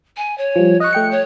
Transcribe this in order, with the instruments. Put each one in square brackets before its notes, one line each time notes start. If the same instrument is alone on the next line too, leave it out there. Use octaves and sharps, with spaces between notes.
[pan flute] G#5
C#5
[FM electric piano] F3 G3
[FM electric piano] D#5 C#6 [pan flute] F#6
[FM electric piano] A3 G5 C#7
[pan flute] C#5